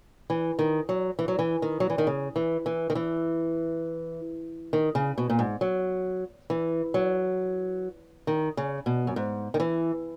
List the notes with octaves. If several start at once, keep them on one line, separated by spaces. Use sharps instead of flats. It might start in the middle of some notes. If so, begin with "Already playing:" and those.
E3
D#3
F#3
E3
F#3
E3
D#3
F#3
E3
D#3
C#3
E3
E3
D#3
E3
D#3
C#3
B2
A#2
G#2
F#3
E3
F#3
D#3
C#3
B2
F#2
G#2
D#3
E3